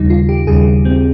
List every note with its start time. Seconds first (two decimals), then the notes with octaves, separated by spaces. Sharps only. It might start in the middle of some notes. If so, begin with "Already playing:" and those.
Already playing: D#2 C#3 G3 D#4
0.10 F4
0.29 G4
0.47 D#2 C#3 G3 G#4
0.85 C4